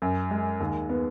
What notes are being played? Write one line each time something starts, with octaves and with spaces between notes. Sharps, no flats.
F#2
G#3
D#2
B3